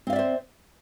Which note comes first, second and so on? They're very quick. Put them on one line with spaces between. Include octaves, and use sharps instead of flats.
C4 F5 D5 E5 C5